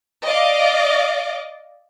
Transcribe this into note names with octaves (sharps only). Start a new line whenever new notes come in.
D5 D#5 F5 D6